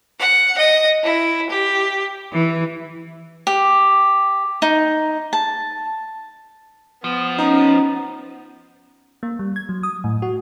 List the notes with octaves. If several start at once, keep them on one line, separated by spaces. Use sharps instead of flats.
F#5
D#5
E4
G4
E3
G4
D#4
A5
F3 B3
C#4 D#4 A#5
A#3
G3
G#6
F#3
D#6
A2
F#4